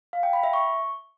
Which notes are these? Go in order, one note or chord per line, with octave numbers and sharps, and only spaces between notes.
F5
G5
B5
E5
C#6